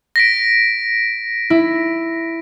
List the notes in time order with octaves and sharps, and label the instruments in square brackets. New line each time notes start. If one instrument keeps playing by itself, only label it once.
[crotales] A#6 B6 D7
[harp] E4